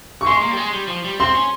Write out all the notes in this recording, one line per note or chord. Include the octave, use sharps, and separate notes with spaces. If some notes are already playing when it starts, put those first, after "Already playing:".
C#6
G#3 C6
A#3
G3
G#3
G3
F3
G3
C4 C6
C#4